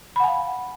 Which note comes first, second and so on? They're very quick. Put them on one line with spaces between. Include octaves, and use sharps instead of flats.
B5 F#5 G#5 F5